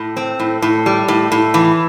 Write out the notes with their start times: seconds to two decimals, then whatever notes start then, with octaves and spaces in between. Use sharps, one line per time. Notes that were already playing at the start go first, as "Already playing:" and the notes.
Already playing: A2
0.17 C4
0.40 A2
0.62 A2
0.86 G3
1.08 A2
1.32 A2
1.54 E3